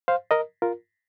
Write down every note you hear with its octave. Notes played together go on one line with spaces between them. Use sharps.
C5 F5
A#4 D#5
F4 A#4